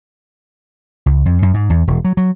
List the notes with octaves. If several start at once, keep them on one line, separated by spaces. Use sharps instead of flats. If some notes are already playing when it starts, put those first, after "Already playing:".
C#2
F2
F#2
G#2
E2
E1
F#3
F#3